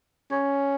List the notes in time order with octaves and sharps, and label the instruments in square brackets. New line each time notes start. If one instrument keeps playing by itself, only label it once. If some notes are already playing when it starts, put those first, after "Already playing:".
[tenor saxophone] C#4